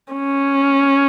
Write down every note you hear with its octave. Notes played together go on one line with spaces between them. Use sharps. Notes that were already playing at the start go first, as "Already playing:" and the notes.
C#4